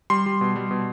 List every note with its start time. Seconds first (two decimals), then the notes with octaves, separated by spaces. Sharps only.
0.10 G3 C6
0.26 G3
0.41 B2
0.56 G3
0.71 B2